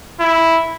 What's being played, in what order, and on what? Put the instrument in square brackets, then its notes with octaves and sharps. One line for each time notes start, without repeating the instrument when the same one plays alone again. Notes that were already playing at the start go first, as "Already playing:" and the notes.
[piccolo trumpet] E4